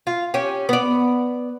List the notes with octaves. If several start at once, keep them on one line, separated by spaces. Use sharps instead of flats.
F4
C#4 G4
B3 D5